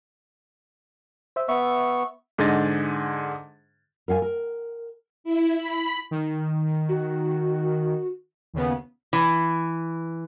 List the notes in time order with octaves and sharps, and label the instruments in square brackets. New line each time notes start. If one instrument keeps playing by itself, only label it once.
[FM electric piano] C5 E5
[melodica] B3 C#6 [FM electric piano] E5
[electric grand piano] G#2 D3 G#4 D#5 A6
[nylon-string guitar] A#4 F5 F#5 G#5
A#4
[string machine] E4
B5
[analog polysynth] D#3
[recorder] F#4
[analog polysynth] D#2 C#3 B3
[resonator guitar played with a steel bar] E3